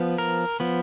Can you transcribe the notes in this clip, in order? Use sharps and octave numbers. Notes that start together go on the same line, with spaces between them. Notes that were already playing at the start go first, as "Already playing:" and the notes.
Already playing: F3 B3
A#4
F3 B3